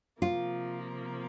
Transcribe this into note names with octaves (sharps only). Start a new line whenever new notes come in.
C3 F3 A#3 F4